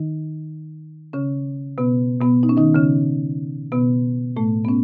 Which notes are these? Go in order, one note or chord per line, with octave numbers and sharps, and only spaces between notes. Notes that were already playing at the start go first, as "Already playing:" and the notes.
Already playing: D#3 D#4
C#3 C#4
B2 B3
B2 B3
D#4
C#4
D#3 D#4
C#3 C#4
B2 B3
A2 A3
B3
C#4